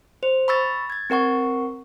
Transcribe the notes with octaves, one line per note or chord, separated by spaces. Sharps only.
C5
B5 C#6 E6 A6
G#6 A6
C4 A#4 F#5 C#6